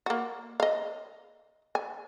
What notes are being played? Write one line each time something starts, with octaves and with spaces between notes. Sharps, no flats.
A#3 F#4
D#5 F5
G#5